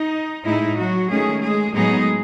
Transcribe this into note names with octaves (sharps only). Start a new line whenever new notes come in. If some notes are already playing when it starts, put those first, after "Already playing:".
Already playing: D#4
A2 G#3 D#4 E4
F#3 F#4
D#3 G#3 A3 C#4 G#4
G#3 G#4
A2 F#3 G#3 B3 D#4 G#4